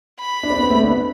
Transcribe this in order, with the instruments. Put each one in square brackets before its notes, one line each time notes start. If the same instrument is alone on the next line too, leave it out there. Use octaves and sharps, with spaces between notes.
[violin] B5
[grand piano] D4
C4
B3
A3 C4
B3 D4